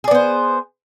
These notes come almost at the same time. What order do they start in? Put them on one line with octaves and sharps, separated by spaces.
G#4 D5 B3 C5